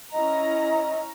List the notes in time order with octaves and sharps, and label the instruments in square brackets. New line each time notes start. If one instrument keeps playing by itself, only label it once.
[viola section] C#4 E4 A#5 [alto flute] D#5